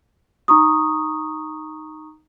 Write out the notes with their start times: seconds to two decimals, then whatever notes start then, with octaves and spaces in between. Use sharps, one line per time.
0.48 D#4 A#5 C#6 D#6